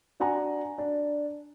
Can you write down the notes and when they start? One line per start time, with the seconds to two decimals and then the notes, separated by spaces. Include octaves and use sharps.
0.20 D4 F#4 F#5 G#5 A#5
0.78 D4